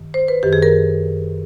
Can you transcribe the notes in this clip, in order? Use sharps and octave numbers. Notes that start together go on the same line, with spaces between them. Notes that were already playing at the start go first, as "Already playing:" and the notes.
Already playing: G2 D#3
C5
B4
F#2 D#3 G4
G#4
A#4